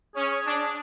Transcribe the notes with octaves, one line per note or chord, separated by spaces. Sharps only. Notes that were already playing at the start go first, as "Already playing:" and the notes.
C#4 G#4
D4